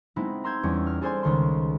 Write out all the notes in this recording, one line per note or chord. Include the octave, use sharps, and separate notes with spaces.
G#3 B3 C4 D#4 E4
A#5 C6 E6 G6 G#6
E2 G3 C#4
F6
G#4 A4 C5 D5 G#5 C6
C#2 D#3 C6